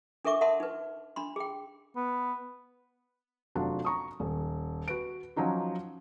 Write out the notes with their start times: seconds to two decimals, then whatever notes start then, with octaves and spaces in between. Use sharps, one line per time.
0.25 D4 A4 A#4 E5 C#6 D6
0.41 A#4 E5 F#5 A5 C6
0.60 D#4 B4
1.16 D4 B5 C6
1.36 G#4 G5
1.96 B3
3.55 F1 F3 F#3 D4 F#4
3.85 A#5 C#6 D#6
4.20 D#1
4.88 F#4 B4 D7
5.36 F3 F#3 C#4 D#4 F#4